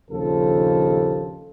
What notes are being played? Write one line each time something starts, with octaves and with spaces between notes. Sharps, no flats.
A#1 D#2 C#3 F3 A4